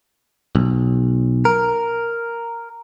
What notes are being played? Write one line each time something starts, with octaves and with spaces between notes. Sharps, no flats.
B1
A#4